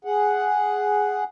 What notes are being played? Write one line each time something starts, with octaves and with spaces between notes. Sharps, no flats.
G#4 F#5